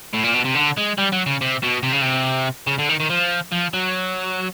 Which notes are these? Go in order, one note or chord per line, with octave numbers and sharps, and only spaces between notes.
A2
A#2
B2
C3
D3
G#3
G3
F#3
C#3
C3
B2
C3
C#3
C3
C#3
D3
D#3
D#3
F3
F3
F#3